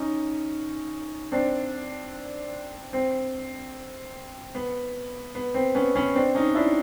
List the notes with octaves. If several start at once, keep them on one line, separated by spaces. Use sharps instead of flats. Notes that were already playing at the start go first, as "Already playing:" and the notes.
Already playing: C#4 D#4
C4 D4
C4
B3
B3
C4
B3 C#4
B3 C#4
C4 D4
C#4 D#4
D4 E4